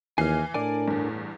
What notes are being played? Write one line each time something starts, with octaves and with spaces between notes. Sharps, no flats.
D#2 E3 G#5 F6 C7
A2 D4 A#4 D5 G#5
E2 G2